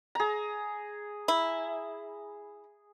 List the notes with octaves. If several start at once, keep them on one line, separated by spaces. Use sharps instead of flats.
G#4 A#5
E4